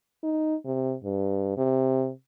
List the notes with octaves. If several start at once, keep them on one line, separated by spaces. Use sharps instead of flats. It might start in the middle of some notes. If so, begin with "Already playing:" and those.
D#4
C3
G2
C3